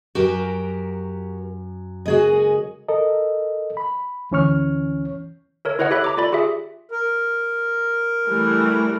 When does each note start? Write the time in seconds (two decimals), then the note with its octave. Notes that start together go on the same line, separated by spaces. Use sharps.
0.15 F#2 F#4 G4 A#4
2.06 C#3 G#3 A#3 F#4 G#4 D#5
2.89 A4 A#4 D#5
3.77 B5
4.31 D2 E3 C#4 C#5 C#6 F6
5.65 A4 A#4 C#5
5.79 E4 B4 C#5 D#5 F#5
5.91 G4 A4 C#5 E5 B5 F#6
6.04 A#5 D6
6.17 F4 A4 D5 B5
6.32 F4 G4 G#4 E5
6.91 A#4
8.28 E3 G3 A3